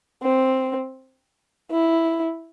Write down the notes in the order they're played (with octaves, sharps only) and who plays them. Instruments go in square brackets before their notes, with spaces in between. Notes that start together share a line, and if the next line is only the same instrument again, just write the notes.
[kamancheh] C4
E4